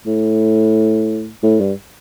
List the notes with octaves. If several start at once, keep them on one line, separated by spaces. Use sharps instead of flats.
A2
A2
G2